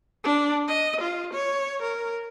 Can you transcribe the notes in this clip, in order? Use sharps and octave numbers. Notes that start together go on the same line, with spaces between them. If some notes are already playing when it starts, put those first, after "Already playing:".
D4
D#5
F4
C#5
A#4